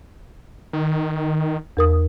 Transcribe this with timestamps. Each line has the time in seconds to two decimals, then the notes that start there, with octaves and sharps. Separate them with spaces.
0.73 D#3
1.77 E2 A#4 D#6